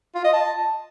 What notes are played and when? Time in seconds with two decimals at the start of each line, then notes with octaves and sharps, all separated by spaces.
0.15 F4
0.24 D#5
0.33 A5